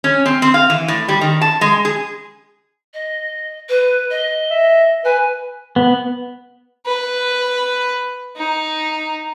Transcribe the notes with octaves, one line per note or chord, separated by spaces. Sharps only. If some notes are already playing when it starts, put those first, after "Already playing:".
C#4
C4
C4
F5
E3
A2
G3
D#3
A5
G#3
G#4
D#5
B4
D#5
E5
B4 G#5
B3
B4
D#4